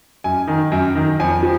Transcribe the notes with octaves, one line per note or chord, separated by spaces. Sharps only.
F#2 G#5
D#3
F#2
D#3
F2 G#5
F3